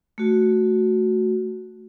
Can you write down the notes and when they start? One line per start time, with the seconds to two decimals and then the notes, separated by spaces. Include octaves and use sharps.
0.18 A3 F#4